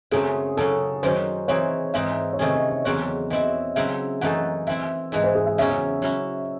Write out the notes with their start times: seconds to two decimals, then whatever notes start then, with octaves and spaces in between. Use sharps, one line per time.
0.11 F#2 C#3 F#3 A3 C4 G#4
0.57 F#2 C#3 F#3 C#4 A4
1.03 F#2 D#3 F#3 C#4 C5
1.48 E3 C4 D#4 G#4 C#5
1.94 G#2 E3 C4 D#4 E5
2.33 C#5
2.39 C3 D#3 A3 C#4 G#4 D#5
2.54 D#5
2.69 D#5
2.84 E2 C#3 F#3 C4 F#4 C#5
3.30 E3 C4 E4 D#5
3.75 C#3 F#3 C4 E4 E5
4.21 F#2 E3 A3 D#4 A4 F#5
4.67 E3 C4 E4 E5
5.12 G#2 E3 G#3 D#5
5.24 C5
5.35 G#4
5.46 E5
5.58 E2 C#3 F#3 C#4 G#4 E5
6.02 F#3 C#4 E4